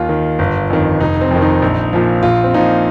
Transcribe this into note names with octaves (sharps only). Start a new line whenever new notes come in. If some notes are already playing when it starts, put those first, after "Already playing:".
Already playing: D#2 F4
D#3
G1
F2 D#3
F1 D#4
C4
F2 D#3
D#4
A#1
A#2 F3
A#1 F4
C4
A#2 F3 D#4